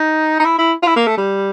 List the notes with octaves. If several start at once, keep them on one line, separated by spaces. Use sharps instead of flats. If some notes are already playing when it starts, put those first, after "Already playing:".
Already playing: D#4
D#4
E4
E4
F4
E4
A#3
A3
G3